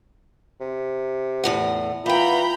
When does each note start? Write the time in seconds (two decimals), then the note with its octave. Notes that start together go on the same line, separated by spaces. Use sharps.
0.61 C3
1.44 E2 A2 F#5
2.06 E3 B3 F4 G5 A#5 B5 G6